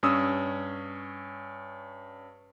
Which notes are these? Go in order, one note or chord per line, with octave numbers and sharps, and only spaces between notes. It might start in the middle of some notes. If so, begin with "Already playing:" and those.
G2 C#4 D#6 E6